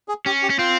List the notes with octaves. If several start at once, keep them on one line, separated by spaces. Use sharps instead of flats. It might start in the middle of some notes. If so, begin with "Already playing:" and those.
G#4
C#4 G4
G4
C#4
C4 F4